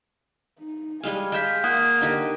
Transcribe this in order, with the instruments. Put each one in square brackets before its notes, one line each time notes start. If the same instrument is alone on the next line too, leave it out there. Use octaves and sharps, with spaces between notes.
[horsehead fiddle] D#4
[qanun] G3 G#3 F5 [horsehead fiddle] G#5
[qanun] G#3 E5 G5 [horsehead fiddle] G#4 F5 [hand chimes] F6 G6 B6
[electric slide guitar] A#3 [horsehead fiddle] F4 [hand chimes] F#5 D#6 F#6
[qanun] D3 D#4 G4 [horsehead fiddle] A#4 D#5